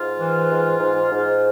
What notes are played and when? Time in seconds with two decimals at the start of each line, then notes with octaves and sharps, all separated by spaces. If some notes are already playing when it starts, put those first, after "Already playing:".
Already playing: G#2 F4
0.19 E3
0.50 G#2
0.79 G#2
1.09 G#2